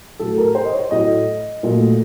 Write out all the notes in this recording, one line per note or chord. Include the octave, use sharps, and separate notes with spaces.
A2 F#3 A3 A4
A#4
C5
D#5
C#5
A2 F#3 A3 D#5
A#2 F#3 A3